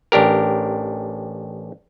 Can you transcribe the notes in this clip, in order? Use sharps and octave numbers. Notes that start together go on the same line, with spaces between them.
A1 D4 G4 A#4